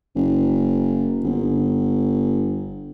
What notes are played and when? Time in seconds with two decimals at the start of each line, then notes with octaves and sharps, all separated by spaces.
0.16 F#1
1.23 G1